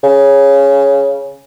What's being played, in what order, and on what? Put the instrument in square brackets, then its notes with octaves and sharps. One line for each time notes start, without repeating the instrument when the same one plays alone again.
[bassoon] C#3